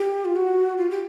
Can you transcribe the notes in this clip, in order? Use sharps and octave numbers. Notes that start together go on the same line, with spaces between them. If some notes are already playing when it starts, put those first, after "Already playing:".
Already playing: G4
F4
F#4
F4
G4